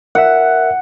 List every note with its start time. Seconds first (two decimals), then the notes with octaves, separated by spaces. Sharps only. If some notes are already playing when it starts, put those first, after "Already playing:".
0.15 A#4 E5 F#5